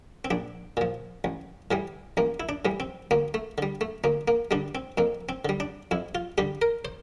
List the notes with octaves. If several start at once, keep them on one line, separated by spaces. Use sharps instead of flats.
C4
A#1 D4
A#2 F3
A1
A2 E3 G3
A1 A#3
E4
D4
A2 E3 G3
C4
D2 A#3
A3
D3 G3
A3
D2 A#3
A#3
D3 G3 D4
C4
F2 A#3
C4
D3 G3
D4
F2 E4
F4
D3 G3 G4
A#4
C5